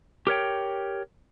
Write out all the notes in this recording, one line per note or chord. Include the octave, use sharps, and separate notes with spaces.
G4 A#4 C#5 G5